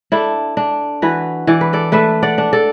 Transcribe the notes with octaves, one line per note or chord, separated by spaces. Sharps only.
D4 E4 A4
D4
E3 F#4 B4
E3 D5
B4
A4 D5
A3 B4 E5
D5 F#5
D4
A4 D5